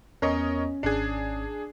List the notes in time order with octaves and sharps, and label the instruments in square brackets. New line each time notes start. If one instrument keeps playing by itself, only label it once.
[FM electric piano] E2 B3 [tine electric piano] C#4 [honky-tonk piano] A#4 C#5 D#5
[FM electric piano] G#1 A5 F#6 [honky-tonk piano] D4 G#4